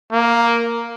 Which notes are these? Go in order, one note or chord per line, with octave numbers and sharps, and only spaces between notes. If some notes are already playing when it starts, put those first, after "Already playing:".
A#3